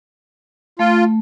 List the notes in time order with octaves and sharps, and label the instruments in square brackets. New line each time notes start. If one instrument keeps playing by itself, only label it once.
[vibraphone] A3 [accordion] F4